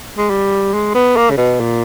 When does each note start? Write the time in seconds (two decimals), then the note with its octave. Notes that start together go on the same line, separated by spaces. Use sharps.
0.17 G#3
0.30 G3
0.74 G#3
0.94 B3
1.16 A#3
1.30 C#3
1.37 B2
1.60 A#2